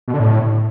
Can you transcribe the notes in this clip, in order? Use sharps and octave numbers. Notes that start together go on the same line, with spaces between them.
B2
D3
A2